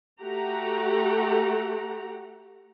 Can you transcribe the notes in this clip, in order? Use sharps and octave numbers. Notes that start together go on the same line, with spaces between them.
A3 F#4 G4 F#5 A#5